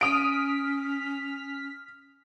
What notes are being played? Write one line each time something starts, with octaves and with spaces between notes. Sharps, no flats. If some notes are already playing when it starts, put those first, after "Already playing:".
C#4 D#6 F6 B6 D7